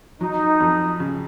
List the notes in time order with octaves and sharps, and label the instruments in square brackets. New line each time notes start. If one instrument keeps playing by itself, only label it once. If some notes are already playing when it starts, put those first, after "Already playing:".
[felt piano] F#3 [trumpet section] D#4
[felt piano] F2
C#3